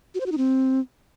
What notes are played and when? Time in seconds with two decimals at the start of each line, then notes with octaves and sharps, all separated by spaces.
0.15 F#4
0.20 C5
0.26 F#4
0.32 D#4
0.38 C4